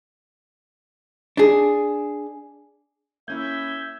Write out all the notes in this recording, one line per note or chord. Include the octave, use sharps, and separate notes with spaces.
D4 G#4
A#3 C#4 E4 E5 G6 G#6